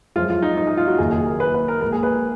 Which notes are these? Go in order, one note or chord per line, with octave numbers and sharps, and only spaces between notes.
F#2 F3 G#3 F4
F4
D#4
D#4
D#4
F4
F#4
F#1 F#2 D#3 A#3 G#4
G#4
A#4
B4
B4
A#4
A#1 A#2 G#3 A#4
G#4
B4